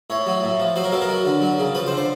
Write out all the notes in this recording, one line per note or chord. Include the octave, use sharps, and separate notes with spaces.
A2 C#5
F#3
A2
F3
F#3 C5
A#4
B2 A4
A#4
F#3
D3
F#3
C#3
F3 B4
C5
D3
C5